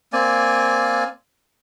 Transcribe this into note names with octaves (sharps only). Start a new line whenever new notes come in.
A#3 C4 D5 G#5